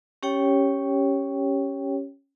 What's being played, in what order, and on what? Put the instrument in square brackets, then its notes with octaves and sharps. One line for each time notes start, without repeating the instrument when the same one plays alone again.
[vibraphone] C#4 G4 C#5 G5